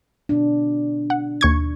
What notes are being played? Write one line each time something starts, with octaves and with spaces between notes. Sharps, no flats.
B2 D4
F#5
D#2 C#6 G#6